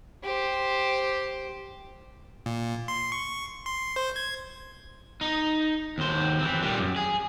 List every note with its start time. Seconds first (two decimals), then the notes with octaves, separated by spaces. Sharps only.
0.24 G4 C5
2.46 A#2
2.88 C6
3.12 C#6
3.66 C6
3.96 C5
4.16 G#6
5.21 D#4
5.98 D#2 C5
6.39 E3 C4
6.62 A#2 G3
6.79 F#2
6.96 G#4